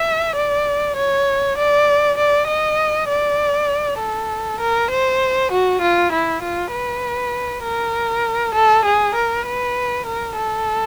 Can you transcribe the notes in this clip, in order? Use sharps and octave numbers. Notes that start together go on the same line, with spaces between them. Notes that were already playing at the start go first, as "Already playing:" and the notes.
Already playing: E5
D5
C#5
D5
D5
D#5
D5
A4
A#4
C5
F#4
F4
E4
F4
B4
A#4
A4
G#4
A#4
B4
A#4
A4